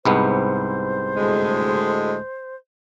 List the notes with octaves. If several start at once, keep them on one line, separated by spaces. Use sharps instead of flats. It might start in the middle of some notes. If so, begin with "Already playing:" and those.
C2 G#2 B3 C5
D2 A2 G#3